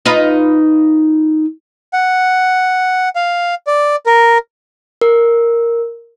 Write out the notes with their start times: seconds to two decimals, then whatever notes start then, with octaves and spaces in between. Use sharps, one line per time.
0.06 D#4 F4 B4
1.93 F#5
3.16 F5
3.67 D5
4.06 A#4
5.01 A#4